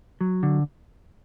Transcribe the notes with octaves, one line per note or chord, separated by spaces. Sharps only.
F#3
D3